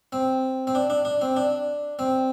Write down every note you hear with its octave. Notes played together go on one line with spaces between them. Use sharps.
C4
C4
D4
D4
D4
C4
D4
C4